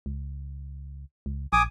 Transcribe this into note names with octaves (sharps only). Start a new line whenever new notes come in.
C#2
C#2
A#1 G#5 D6 D#6